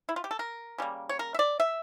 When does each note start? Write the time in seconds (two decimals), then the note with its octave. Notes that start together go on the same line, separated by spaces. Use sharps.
0.09 E4
0.16 F4
0.24 G4
0.31 A4
0.39 A#4
0.78 C#3 G3 A#3
1.09 C#5
1.19 A#4
1.34 E5
1.39 D5
1.60 E5